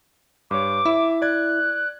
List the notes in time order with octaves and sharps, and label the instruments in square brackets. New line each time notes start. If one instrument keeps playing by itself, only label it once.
[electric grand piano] G2 C#5 [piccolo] D6
[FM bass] E4 [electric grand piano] E5
[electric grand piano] D5 G#6 [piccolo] F#6